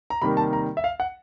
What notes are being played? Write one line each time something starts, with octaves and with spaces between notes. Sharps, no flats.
A#5
C3 D#3 G3 A#3 B5
A5
A#5
E5
F5
F#5